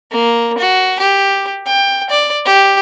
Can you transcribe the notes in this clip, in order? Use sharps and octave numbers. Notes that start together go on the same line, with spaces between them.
A#3
F#4
G4
G5
D5
G4